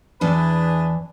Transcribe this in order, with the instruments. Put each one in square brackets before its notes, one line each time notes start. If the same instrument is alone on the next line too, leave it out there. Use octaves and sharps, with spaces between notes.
[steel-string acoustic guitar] E2 E3 D5 [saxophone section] D4 G#4 B4